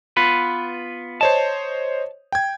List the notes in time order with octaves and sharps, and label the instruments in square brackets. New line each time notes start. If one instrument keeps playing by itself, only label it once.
[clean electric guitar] B3 F4 B4
[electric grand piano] C5 C#5 D#5 [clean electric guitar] A5
[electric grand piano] G5 G#6